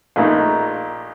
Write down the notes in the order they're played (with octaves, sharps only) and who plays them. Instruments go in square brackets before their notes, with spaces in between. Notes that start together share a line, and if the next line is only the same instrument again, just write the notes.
[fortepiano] A#1 A#2 A3 D#4